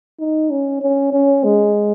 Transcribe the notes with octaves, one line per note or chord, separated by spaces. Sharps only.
D#4
C#4
C#4
C#4
G#3